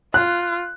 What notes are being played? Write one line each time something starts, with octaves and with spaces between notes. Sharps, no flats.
F4 F#6